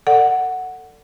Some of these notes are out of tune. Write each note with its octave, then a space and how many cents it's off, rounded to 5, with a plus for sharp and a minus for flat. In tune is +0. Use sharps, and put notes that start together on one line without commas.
A4 +30 D5 +0 F#5 +0